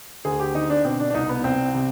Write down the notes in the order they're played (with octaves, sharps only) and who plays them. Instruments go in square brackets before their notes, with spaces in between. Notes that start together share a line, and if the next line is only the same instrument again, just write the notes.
[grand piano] D2 G#4
G4
D3 D#4
D4
B2 C4
D4
D4
C2 D#4
B3
C2 C4
C3